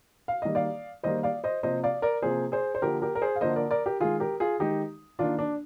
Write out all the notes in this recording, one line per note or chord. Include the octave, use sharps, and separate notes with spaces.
F5
D#3 G3 A#3 D#5
D5 F5
D#3 G3 A#3 C5 D#5
D5 F5
C5 D#5
C3 F3 A#3 C5 D#5
D5 F5
A#4 D5
C3 F3 A#3 G#4 C5
G#4 C5
C5
D3 F3 A#3 G4 A#4
G4 A#4
A#4
G#4 C5
F5
D3 F3 A#3 C5 D#5
A#4 D5
A#4 D5
G4 A#4
D#3 G#3 F4 G#4
G4 A#4
F4 G#4
D#3 G#3 D#4 G4
D#3 A#3 D4 F4
D4